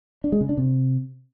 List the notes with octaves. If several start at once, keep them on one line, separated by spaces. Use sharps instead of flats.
D4
G#3
C#3
D4
C3